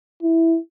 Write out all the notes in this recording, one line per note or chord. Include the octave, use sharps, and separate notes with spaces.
E4